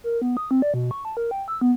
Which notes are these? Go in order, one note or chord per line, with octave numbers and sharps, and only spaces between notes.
A#4
B3
D#6
C4
D5
B2
C#6
A5
A#4
G5
E6
B3